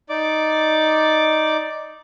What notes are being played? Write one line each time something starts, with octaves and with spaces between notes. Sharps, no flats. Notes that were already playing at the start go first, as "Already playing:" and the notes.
D#4 D5 D6